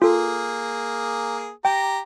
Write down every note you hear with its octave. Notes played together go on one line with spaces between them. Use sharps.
A#3 F4 G#4 A4
G4 G5 A#5